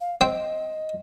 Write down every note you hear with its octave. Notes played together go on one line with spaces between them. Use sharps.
F5
C4 D#5 G5